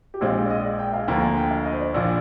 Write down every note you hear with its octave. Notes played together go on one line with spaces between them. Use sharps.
G4
A#1 A#2 G#3 C4 G#4
G#4
D5
D#5
D5
G5
F5
D2 D3 F3 A#3 G5
G#5
G5
F5
D#5
C5
D5
A#1 A#2 F3